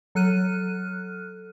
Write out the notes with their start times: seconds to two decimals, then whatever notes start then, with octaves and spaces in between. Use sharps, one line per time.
0.15 F#3 A4 F6 F#6 D#7